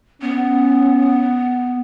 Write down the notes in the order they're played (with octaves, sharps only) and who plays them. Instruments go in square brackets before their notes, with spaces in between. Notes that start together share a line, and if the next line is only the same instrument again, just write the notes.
[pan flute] B3 [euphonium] C#4